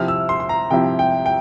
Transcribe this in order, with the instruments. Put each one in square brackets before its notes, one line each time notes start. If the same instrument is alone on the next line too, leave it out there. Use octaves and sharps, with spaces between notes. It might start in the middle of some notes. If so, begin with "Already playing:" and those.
Already playing: [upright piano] C3 F3 C4 E4 F6
E6
C6
C6
A#5
C3 F3 C4 E4 G5
G5
G5